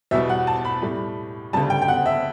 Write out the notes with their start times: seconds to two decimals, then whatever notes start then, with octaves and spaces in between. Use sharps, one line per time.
0.11 E2 B2 G3 E5
0.29 F#5
0.47 A5
0.65 B5
0.81 A2 G3
1.53 D2 C#3 G3 A5
1.70 G5
1.82 G5
1.88 F#5
2.06 E5